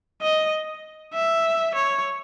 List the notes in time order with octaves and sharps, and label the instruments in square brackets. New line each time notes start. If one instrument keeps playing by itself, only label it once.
[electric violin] D#5
E5
C#5